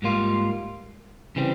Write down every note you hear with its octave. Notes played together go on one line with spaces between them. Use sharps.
G#2 G3 A#3 F4
C#3 E3 G3 C4